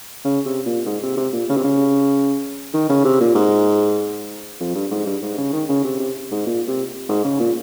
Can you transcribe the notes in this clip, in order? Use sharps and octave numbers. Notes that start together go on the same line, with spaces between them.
C#3
C3
A#2
G#2
C3
C3
A#2
C#3
C3
C#3
D#3
C#3
C3
A#2
G#2
F2
G2
G#2
G2
G#2
C#3
D#3
C#3
C3
C3
G#2
A#2
C3
G#2
C#3
A#2